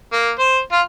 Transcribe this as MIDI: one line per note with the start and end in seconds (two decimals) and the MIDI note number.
0.12 0.31 58
0.39 0.60 72
0.72 0.81 65